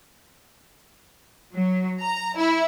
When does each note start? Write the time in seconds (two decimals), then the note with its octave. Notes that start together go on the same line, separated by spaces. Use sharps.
1.53 F#3
2.01 A#5
2.36 E4